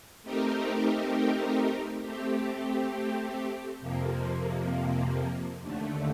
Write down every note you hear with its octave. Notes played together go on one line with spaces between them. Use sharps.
A3 C4 D#4 G4 A#4
A3 C4 G4
F2 C3 F3 A#3
D#2 D3 A3